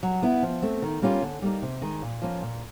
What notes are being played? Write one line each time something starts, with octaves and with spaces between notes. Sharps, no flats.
F#3
B3 E4
F3
A3 C4
D#3
G3 A#3 C#4 F4
D3
G3 A#3 D#4
C3
D#3 G#3
A#2
F3 A#3 C#4 F4
A#2